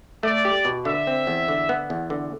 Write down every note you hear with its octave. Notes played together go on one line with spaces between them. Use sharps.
A3 D5
G4
B2
D3 E5
C4
E2
D3
B3
E2
D3